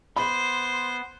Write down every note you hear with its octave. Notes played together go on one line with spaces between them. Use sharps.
B3 C5 B5 C6